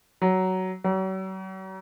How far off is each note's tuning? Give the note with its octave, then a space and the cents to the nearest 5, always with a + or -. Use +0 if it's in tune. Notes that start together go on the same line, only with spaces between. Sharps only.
F#3 +15
F#3 +45